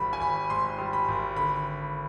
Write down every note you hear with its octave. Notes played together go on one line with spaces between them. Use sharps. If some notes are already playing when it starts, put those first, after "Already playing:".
Already playing: G#1 G3 B5
G#5
G#1 B5
G#2 C6
G3
B5
G#1
D3 B5